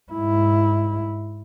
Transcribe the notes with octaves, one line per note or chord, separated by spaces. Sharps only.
G#2 E4